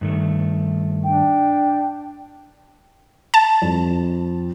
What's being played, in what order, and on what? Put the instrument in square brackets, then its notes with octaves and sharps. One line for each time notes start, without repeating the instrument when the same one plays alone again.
[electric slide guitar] G2 D#3 A3
[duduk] D4 [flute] G5
[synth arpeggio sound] A5
[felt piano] F2